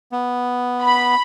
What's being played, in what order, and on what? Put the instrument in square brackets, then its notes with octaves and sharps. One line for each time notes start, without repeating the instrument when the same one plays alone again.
[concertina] B3
[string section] B5